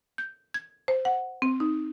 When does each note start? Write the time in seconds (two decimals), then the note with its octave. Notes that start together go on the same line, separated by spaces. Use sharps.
0.18 G6
0.54 G#6
0.88 C5
1.05 F#5
1.42 C4
1.60 D#4